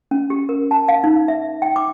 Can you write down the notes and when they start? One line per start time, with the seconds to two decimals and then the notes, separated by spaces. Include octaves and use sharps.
0.11 C#4
0.30 G4
0.49 A#4
0.71 A5
0.88 F5
1.04 D#4
1.28 E5
1.62 G5
1.76 D6